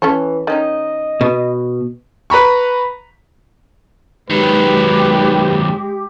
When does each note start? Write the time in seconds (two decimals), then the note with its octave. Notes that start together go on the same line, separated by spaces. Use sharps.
0.02 E3 C#4 A4 C#5
0.47 D#3 C#4 D#4 D#5
1.21 B2
2.30 B4 A#5 B5 C#6
4.30 D#3 F#3 G#3 G4 B4